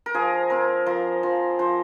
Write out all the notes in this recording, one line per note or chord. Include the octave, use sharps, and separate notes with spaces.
A#4
F3 G#4
C4 A#4
F3 A#4
F3
F3 C5